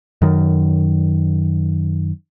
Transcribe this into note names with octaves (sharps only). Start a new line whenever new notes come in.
F#2 D#3